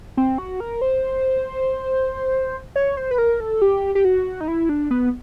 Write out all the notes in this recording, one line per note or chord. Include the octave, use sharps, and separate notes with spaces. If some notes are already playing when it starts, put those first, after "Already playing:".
C4
F#4
A#4
C5
C#5
C5
B4
A#4
A4
G4
G4
F#4
D#4
E4
D4
B3